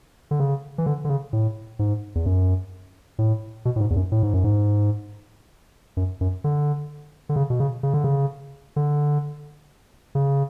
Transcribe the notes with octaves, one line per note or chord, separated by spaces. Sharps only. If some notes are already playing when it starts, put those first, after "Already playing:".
D3
C#3
E3
D3
D3
C#3
A2
G#2
E2
F#2
A2
B2
A2
G#2
E2
F#2
A2
G#2
F#2
G#2
F#2
F#2
D3
D3
C#3
B2
C#3
C#3
D3
C#3
D3
C#3